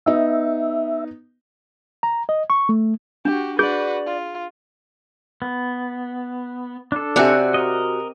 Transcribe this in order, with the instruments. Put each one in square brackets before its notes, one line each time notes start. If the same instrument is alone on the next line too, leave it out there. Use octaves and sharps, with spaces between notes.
[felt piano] B3 D#4 [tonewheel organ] E5
[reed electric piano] A#5
D#5
C#6
A3
[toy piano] D4 [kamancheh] F#4 G4
[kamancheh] F#4 B4 [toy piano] G#4 [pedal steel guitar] D5 G6
[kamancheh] F4
[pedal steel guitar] B3
D4 A4
[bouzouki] C3 F#4 G#5 [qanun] C4 G4 [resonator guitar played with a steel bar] D5 E5
[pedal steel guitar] A#4 D#5